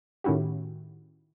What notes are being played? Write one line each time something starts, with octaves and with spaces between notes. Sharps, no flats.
A2 D#3 C#4 E4 F#4 G4